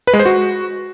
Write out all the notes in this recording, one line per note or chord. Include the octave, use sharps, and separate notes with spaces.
B4
G#3
C5
F#4